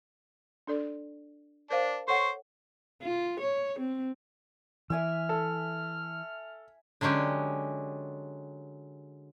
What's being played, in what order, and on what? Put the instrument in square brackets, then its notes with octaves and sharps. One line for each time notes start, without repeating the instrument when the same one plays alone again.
[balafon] D4 A4 D5
[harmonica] D4 [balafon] A#4 C5 F5
[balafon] A4 C#5 F#5 [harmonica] C5 C#6
[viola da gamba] F4
C#5
C4
[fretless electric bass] E3 [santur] E5 G#5 E6 [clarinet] F6
[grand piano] A4
[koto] D3 F#3 G#3 C#4 G4